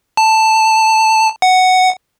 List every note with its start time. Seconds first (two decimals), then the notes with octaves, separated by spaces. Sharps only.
0.17 A5
1.42 F#5